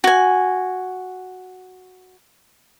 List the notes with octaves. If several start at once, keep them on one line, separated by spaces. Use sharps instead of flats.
F#4 G#5